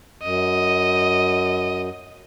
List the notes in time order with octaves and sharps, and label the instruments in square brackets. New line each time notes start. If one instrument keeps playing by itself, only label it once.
[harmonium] F#2 [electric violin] D#5